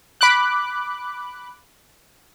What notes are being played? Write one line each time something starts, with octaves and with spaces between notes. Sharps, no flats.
B5 D6 F#6